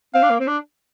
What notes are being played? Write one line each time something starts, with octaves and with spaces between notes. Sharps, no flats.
C4 F5
D4
A#3
C4
D4